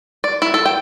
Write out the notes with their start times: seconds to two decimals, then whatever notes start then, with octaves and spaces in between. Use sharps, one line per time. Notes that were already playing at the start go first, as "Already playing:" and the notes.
0.24 D5
0.42 E4
0.54 A4
0.66 G5